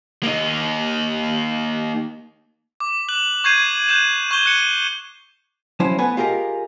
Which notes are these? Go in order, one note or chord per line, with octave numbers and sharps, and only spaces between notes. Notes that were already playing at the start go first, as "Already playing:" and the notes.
A#3 D#4
D6
D6 F#6 F#7
C#6 G6 G#6 C7 D#7
F#6 G6 D#7 E7
C#6 G6 G7
F#6 C#7 D#7
F3 F#3 C#4 E4 C5
A3 B3 B4 G#5
F4 G4 G#4 A#4 D#5